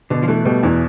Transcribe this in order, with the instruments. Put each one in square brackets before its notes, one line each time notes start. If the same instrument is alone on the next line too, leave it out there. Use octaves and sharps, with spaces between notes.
[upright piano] B2 [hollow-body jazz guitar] D3
[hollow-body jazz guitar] F3
[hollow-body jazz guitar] E3 [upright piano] A3
[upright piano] B2 [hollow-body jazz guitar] G3
[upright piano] E2 [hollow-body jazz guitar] E3